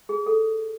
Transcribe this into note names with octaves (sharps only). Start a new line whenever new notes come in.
G#4
A4